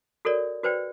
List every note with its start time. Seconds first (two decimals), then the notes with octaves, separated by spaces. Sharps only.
0.25 F#4 A4 A#4 C#5 D5
0.64 F#4 B4 C5 D5 G5